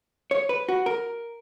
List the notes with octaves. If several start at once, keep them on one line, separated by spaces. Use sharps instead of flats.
C#5
B4
F#4
A#4